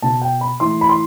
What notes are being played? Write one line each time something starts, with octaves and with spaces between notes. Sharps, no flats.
B2 A5
G5
B5
A2 E3 C6
B5
C6